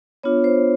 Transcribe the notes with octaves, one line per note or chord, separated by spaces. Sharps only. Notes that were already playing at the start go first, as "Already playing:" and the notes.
B3 D4 F4 C#5
C5